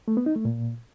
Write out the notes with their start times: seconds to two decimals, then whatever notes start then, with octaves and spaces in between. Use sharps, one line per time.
0.08 A3
0.17 B3
0.26 D#4
0.36 A3
0.45 A#2